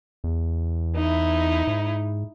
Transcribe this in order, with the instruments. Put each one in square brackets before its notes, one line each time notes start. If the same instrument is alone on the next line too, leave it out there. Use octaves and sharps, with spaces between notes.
[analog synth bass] E2
[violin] D#4 E4
[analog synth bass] G#2